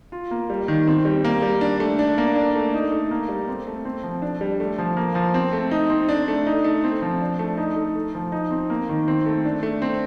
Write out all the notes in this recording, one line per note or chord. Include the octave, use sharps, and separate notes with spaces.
F4
A#3
G3
D#3
C4
G3
A#3
G3
D4
A3
D4
A#3
D4
A3
D#4
A3
A#3
G3
C4
A3
C4
F3
D4
G3
A3
F3
A#3
F3
C4
A3
D#4
C4
D4
A3
D#4
A3
C4
F3
D4
A3
D#4
A3
A3
F3
D#4
C4
A#3
D#3
C4
A3
D4
A3
C4